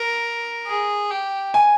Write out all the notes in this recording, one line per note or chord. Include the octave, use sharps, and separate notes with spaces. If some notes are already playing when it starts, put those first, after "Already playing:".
Already playing: A#4
G#4
G4
G#5